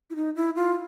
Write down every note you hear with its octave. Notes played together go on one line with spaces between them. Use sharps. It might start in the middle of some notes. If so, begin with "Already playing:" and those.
E4
D#4
E4
F4